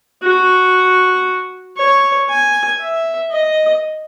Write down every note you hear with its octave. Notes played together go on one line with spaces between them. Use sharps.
F#4
C#5
G#5
E5
D#5